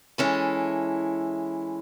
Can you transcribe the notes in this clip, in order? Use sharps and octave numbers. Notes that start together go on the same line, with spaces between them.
E3 G#3 C#4 E4 A4